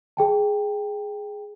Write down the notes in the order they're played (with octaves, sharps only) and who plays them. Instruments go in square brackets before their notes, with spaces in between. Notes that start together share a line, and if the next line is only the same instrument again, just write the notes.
[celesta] G#4 G5 A5